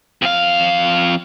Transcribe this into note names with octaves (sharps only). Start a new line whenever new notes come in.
F2 F5